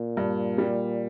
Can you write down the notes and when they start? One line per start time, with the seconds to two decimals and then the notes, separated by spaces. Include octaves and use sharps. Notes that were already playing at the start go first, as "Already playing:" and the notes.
Already playing: A#2
0.17 G2
0.58 G3